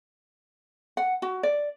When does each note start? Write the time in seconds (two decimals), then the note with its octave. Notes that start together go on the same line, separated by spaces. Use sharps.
0.97 F#5
1.22 F#4
1.43 D5